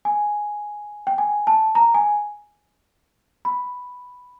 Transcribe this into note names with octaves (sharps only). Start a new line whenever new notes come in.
G#5
G5
G#5
A5
A#5
G#5
B5